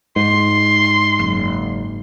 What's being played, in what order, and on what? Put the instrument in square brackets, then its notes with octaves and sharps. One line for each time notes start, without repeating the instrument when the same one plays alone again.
[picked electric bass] G#2 [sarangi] C6
[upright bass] F#1